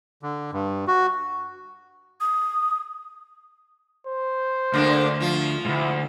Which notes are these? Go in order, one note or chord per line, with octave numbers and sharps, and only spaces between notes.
D3
G2
F#4
D#6
C5
D2 D3 A#3 D4
F3 F4
D2 G#2 E4